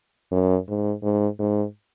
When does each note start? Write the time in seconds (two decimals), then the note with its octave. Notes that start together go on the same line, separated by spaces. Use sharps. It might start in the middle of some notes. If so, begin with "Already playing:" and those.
0.31 F#2
0.68 G#2
1.03 G#2
1.39 G#2